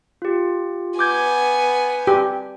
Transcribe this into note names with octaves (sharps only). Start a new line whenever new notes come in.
F4 G4
B3 G#5 D6 G6 G#6
G4